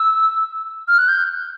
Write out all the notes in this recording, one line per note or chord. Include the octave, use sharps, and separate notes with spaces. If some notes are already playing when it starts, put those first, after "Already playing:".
Already playing: E6
F6
F#6
G6